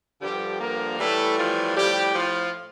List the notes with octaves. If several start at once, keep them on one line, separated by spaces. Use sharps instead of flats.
G2 D3 F3 G3 G4
A#3 A#4
A2 E3 G3 A3 A4
F3 F4
A2 F3 G3 G4
F3 F4